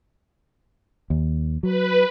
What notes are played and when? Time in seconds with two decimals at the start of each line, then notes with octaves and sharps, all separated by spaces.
1.10 D#2
1.63 F#3 B4